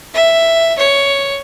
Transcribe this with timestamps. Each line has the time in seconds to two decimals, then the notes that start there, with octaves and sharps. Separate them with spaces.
0.14 E5
0.78 C#5